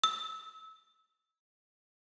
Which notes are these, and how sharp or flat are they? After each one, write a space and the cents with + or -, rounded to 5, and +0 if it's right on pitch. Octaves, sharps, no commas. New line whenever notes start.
E6 -20